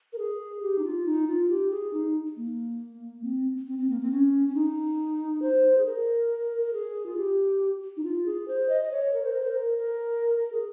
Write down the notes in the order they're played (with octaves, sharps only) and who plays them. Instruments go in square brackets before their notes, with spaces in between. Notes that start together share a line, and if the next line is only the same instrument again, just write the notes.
[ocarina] A#4
G#4
G4
D#4
F4
D#4
F4
G4
G#4
D#4
A#3
C4
C4
C4
A#3
C4
C#4
C#4
D#4
C5
G#4
A#4
A#4
G#4
F4
G4
D#4
F4
G#4
C5
D#5
D#5
C#5
A#4
C5
A#4
C5
A#4
A#4
A#4
G#4